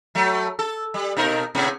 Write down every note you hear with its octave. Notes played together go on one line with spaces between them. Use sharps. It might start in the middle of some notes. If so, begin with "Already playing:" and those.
F#3 A3
A4
G3
B2 D#4 A#4
A2 C3 B3